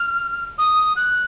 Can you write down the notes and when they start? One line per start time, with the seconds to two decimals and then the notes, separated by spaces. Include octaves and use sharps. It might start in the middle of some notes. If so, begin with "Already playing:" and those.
Already playing: F6
0.58 D#6
0.96 F#6